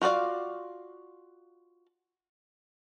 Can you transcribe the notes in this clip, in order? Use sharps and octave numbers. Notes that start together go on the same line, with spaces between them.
F4 F#4 B4 D5 F5